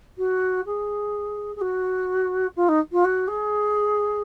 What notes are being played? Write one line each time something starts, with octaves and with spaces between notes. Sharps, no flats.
F#4
G#4
G#4
F#4
F4
D#4
F4
F#4
G#4